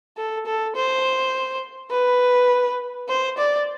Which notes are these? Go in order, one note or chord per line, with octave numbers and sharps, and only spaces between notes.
A4
A4
C5
B4
C5
D5